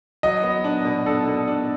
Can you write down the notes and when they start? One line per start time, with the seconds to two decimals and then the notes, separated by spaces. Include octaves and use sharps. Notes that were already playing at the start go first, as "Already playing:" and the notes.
0.23 F#3 D#5
0.43 B3
0.64 D4
0.85 B2
1.06 D4 A4
1.28 B2
1.48 D4